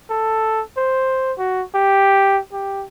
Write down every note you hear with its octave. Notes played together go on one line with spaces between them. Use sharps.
A4
C5
F#4
G4
G4